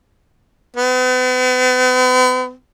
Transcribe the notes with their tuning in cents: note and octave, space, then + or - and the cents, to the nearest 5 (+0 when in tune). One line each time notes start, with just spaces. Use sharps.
B3 +45